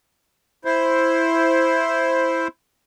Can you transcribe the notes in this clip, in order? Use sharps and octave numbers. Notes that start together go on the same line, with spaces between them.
E4 C5